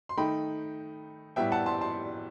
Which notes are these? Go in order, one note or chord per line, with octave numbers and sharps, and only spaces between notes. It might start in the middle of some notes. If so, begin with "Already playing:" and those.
C6
D#3 A3 D#4 G5 B5
A2 G3 B3 E5 G5
F#5 A5
A5 C6
A5 C6